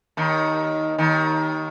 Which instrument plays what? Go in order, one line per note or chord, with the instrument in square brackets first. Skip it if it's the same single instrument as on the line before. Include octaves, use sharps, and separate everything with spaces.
[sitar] D#2 D#3
D#2 D#3